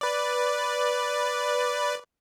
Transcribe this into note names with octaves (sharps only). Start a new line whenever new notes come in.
B4 D5